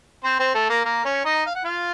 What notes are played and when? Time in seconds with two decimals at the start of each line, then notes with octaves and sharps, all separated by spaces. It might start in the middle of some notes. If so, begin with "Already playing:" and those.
0.24 C4 C5
0.39 C4 C5
0.54 A3 A4
0.69 A#3 A#4
0.85 A#3 A#4
1.05 C#4 C#5
1.25 D#4 D#5
1.46 F5
1.55 F#5
1.65 F4 F5